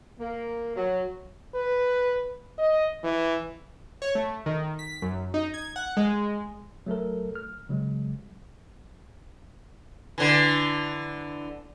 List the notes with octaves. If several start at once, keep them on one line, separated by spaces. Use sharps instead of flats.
A#3
F#3
B4
D#5
E3
C#5
A3
D#3
B6
F#2
D#4
G#6
F#5
G#3
F#3 A3 A4 A#4
F6
C#3 F#3 G#3
D3 E3